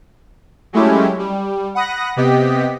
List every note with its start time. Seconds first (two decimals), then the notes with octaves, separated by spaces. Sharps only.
0.73 F#3 G#3 A3 C#4 E4 G4
1.19 G3
1.75 F#5 B5 D#6 F#6 A#6
2.16 C3 B3 G4 D#5 B6